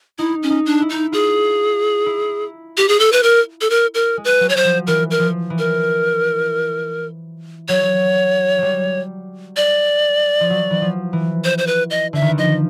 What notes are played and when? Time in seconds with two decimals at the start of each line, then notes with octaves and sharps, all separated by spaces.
0.18 D#4 E4
0.43 C#4
0.50 D#4
0.66 D4
0.81 E4
0.90 D#4
1.12 F4 G#4
2.06 E4
2.77 G4
2.88 G#4
3.00 A4
3.12 B4
3.23 A#4
3.61 A4
3.70 A#4
3.94 A#4
4.17 G#3
4.25 B4
4.40 F#3
4.49 C#5
4.57 C5
4.64 F3
4.87 E3 A#4
5.11 A#4
5.19 F3
5.50 E3
5.59 A#4
7.68 F#3 C#5
8.58 F#3 G3
9.57 D5
10.40 F3
10.50 F#3
10.70 E3
10.82 F3
11.13 E3
11.44 C5
11.58 C5
11.67 B4
11.90 D#5
12.13 D3 E5
12.21 D#3
12.29 E3
12.38 F3 D#5